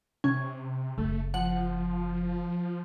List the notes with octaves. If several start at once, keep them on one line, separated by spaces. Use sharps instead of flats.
C3 C#4
F#1 A3
F3 F#5